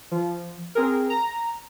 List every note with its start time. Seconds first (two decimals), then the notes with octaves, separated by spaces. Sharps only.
0.11 F3
0.75 C4 G#4 A#4
1.10 A#5